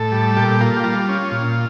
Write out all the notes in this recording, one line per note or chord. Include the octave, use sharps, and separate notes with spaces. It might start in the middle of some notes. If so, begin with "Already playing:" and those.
Already playing: A2 A4
G3
A#2 G4
A#3 F4
G4
G3 F4
C#4
A#2